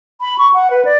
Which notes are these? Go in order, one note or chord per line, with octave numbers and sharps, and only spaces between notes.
B5
C#6
F#5
B4
D5